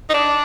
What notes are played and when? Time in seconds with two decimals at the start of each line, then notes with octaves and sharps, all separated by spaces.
0.10 D#4
0.14 D4